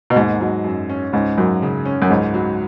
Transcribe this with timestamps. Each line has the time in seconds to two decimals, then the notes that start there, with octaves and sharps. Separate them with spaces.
0.10 B2
0.16 D#2 G#2
0.41 F#3
0.64 F#2
0.89 C#4
1.13 C#2 G#2
1.38 F#2 F#3
1.62 C#3
1.85 C#4
2.02 F#2
2.10 C#2 G#2
2.34 F#3